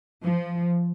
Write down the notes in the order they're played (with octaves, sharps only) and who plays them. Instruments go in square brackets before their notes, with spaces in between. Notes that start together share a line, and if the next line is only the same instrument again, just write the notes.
[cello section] F3